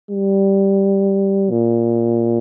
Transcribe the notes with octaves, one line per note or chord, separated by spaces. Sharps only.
G3
A#2